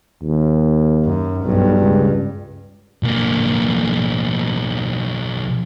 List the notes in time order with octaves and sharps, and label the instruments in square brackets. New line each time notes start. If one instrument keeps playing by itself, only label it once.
[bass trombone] D#2
[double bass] F#2
[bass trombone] B1 [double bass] G2
[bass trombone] C#2
[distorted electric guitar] B1 A#3